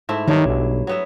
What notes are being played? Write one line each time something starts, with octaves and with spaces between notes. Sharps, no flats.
G#2 A3 E4
G2 D#3 F#3 D4
B1
F#3 B3 E5